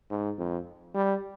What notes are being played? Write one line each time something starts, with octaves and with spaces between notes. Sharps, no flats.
G#2
F2
G3